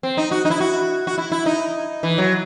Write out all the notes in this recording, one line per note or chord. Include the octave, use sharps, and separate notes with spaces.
C4
D#4
F#4
D#4
E4
F#4
F#4
E4
E4
D#4
E3
F#3